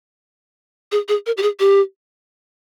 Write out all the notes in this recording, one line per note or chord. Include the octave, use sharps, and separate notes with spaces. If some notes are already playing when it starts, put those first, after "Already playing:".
G#4
G#4
A#4
G4
G#4
G4